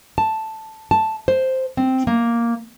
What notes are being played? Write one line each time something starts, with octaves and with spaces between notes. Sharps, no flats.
A5
A5
C5
C4
A#3